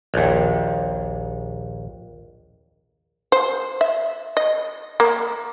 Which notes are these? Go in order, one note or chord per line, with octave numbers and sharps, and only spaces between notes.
A#1 D#2
C5
E5
D#5
A#3